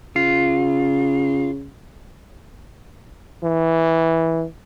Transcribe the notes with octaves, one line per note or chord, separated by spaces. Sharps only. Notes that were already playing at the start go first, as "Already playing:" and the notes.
C#3 F4
E3